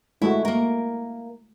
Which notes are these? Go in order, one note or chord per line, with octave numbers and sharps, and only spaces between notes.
G#3 A3 E4 F#4
A#3 A#4